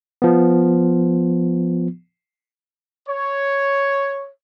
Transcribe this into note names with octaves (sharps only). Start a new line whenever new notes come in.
F3 B3
C#5